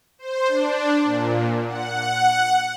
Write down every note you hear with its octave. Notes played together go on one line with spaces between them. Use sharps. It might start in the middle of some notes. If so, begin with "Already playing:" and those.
C5
D4
A#2
F#5